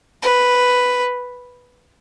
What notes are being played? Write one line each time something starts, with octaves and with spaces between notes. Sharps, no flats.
B4